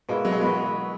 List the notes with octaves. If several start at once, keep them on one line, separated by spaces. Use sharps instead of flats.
B2 G#3 A#3 E4
F#3
G#3
E3 F#3 B3 F#4 B4